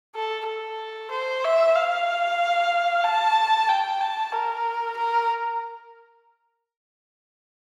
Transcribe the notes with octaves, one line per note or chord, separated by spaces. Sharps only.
A4
A4
C5
E5
F5
A5
G5
A5
A#4
A#4